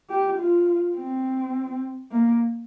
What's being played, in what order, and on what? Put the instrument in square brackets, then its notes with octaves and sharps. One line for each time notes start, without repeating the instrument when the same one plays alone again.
[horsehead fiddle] G4
F4
C4
A#3